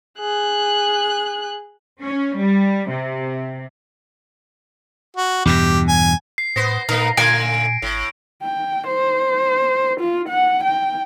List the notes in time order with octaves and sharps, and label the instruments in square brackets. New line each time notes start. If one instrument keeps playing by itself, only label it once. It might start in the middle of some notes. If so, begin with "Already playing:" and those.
[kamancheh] G#4 F#6
[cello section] C#4
G3
C3
[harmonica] F#4
[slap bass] E2 G2 B2 [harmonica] G4
[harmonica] G#5
[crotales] C7
[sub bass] A2 [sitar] B3 C5 [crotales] A#6
[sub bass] A#2 [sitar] A3 B3 D#4 [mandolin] A#4
[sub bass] A#2 [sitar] D3 A3 F4 [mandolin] G#5 [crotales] D7
[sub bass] G#1 [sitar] A2
[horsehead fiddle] G5
C5
F4
F#5
G5